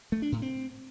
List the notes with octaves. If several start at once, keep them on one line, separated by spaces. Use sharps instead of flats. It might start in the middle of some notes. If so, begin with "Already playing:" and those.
A3
D4
A2
C4